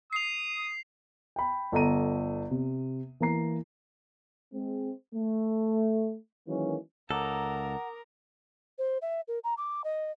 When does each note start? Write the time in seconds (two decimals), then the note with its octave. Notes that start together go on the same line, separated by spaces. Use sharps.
0.13 D#6 C7 F7
1.36 G5 B5
1.72 G1 A4 D#5 A#5 D#7
2.51 C3
3.20 E3 A#3 A#5 C7
4.53 G#3 C4
5.14 A3
6.47 D#3 E3 F#3 G#3 A#3 C#4
7.10 C#2 A4 A#4 F#5 A#5 D6 D#6
8.78 C5
9.02 E5
9.28 A#4
9.44 A#5
9.57 D6
9.84 D#5